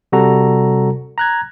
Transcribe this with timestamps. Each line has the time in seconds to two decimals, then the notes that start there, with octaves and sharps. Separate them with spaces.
0.12 C3 G3 F#4 A4 A#5
1.18 A#5 F#6 G#6